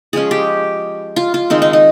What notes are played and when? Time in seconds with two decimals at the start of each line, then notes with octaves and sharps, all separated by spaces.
0.13 F3 G#3 C#4 G#4
0.31 G4
1.16 F4
1.34 F4
1.50 D#3 G#3 C4 D#4
1.62 D#4
1.73 D#4